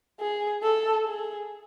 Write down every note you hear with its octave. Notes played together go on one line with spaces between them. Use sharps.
G#4
A4
G#4